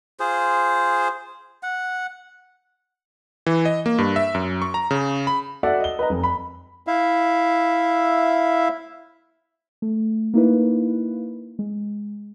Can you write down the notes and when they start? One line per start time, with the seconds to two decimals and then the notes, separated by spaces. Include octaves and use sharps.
0.20 F4 G#4 C5
1.63 F#5
3.46 E3
3.65 D#5
3.86 A#3
3.98 G2
4.16 E5
4.35 F#2
4.62 C#6
4.74 A#5
4.91 C#3
5.27 B5
5.63 F#4 A4 D5 E5 F#5
5.80 D#5 G7
5.99 B4 D#5 A#5
6.10 F1
6.24 B5
6.87 E4 E5 F5
9.82 A3
10.34 A#3 D#4 E4 B4
11.59 G#3